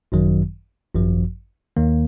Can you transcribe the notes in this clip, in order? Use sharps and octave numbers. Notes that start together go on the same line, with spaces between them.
G#1 F#2 D#3 F#3
G#1 F#2 F3
D#2 D#3 A#3